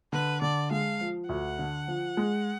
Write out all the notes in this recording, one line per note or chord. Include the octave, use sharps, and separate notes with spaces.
D3 B4
D3 D5
G#3 F5
F3
D2 F#5
D3
F3
G#3